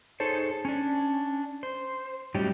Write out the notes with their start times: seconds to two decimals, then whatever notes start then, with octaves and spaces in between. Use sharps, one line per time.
0.20 D#4 G#4 A4 C5 C#5
0.65 C#4 D4
1.63 C5
2.34 A2 F#3 G3 C#4 D#4 G4